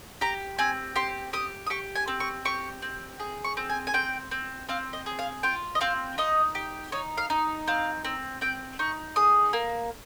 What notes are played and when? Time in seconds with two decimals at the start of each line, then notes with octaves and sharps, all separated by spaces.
0.21 G4 A#5
0.58 C4 G#5
0.96 G4 C6
1.33 G4 D#6
1.66 D#6
1.70 G4 C#6
1.95 G#5
2.08 C4
2.20 C#6
2.45 G4 C#6
2.82 C4
3.20 G#4
3.44 C#6
3.57 C4
3.69 G#5
3.87 G#5
3.94 C4 G5
4.31 C4
4.69 C4 F5
4.93 D#5
5.06 G#4
5.19 F5
5.43 F4 G5
5.75 D#5
5.81 C4 F5
6.18 D#4 D#5
6.55 G4
6.92 D#4 C#5
7.18 F5
7.30 D#4
7.68 C4 F5
8.05 C4
8.41 C4 G5
8.79 D#4 C#6
9.16 G#4 D#6
9.53 A#3